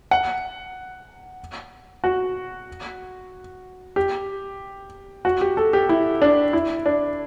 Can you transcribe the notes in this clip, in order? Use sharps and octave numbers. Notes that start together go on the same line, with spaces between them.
F#5
F#4
G4
F#4
G4
A4
G4
E4
D4
E4
D4